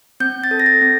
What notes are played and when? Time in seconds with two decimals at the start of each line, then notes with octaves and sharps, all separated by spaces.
0.20 C4 G6
0.44 A6
0.51 A4
0.60 A#6
0.66 A6
0.81 C4